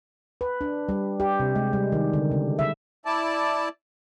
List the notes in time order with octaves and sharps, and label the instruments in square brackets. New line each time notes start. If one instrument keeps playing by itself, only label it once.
[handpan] B4
D4
G3
G4
C3
G#3
G3
D#3
D3
C#3
E5
[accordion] E4 D5 A5